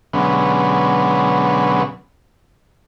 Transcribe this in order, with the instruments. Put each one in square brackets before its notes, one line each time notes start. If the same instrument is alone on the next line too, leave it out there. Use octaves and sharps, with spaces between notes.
[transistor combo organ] B2 D3 F#3 G#3 B3 C#4